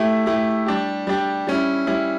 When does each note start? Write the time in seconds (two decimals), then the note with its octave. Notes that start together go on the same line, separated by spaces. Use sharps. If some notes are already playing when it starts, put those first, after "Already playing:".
Already playing: A3 E4 G4
0.26 A3 E4 G4
0.66 G3 D4 G4
1.07 G3 D4 G4
1.47 G3 C#4 E4
1.87 G3 C#4 E4